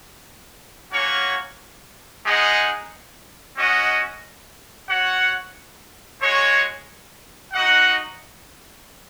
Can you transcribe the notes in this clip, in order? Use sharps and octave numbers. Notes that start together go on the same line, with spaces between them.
A#3 C#4 F#4 C#5 F#5
G#3 D#4 G#4 D#5 F#5
C#4 F#4 D#5 F#5
F#4 C#5 F#5
G#3 F#4 C#5
D#4 F#4 D#5 F#5